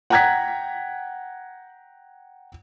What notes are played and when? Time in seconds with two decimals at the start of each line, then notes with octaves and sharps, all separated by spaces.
0.10 F#5 G5 A#5 F#6 G#6 B6